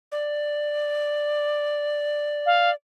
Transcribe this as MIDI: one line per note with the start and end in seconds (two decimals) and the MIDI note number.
0.12 2.74 74
2.46 2.70 77